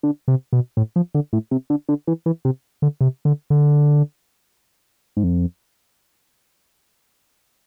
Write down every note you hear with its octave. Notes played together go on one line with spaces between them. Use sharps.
D3
C3
B2
A2
F3
D3
A2
C3
D3
D3
E3
E3
C3
D3
C3
D3
D3
G#2
F2